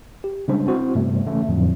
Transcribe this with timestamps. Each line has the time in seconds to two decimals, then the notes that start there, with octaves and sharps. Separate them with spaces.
0.24 G4
0.48 C#3 G3 G#3 C#4 D4 C5
0.67 C4 E4 F#4 C5
0.95 G2 C3 G3 A3 B3
1.26 C#3 E3 A3 C#4
1.49 F2 A2 D3 F3 F#3